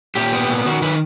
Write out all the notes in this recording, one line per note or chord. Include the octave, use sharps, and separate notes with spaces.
A#2 G4
B3
A#2
D#3 F#4
D#3 B4